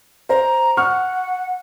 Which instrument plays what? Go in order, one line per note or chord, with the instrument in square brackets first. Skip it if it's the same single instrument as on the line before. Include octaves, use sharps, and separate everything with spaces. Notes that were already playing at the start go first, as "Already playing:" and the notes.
[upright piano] C5 [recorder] A#5
[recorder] F#5 [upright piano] C#6 F6